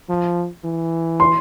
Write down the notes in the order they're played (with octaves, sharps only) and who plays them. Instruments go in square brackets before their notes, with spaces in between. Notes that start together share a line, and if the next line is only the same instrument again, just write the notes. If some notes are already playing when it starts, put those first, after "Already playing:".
[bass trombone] F3
E3
[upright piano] C6